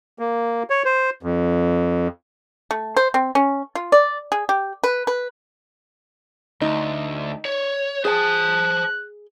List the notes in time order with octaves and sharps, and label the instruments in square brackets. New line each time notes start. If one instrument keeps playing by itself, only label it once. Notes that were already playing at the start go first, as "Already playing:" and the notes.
[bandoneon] A#3
C#5
C5
F2
[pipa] A3
C5
C4
C#4
F4
D5
G#4
G4
B4
B4
[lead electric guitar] D2 [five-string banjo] D#4
[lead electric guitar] C#5
[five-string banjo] G#4 G5 [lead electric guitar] C5 A5 [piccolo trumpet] F#6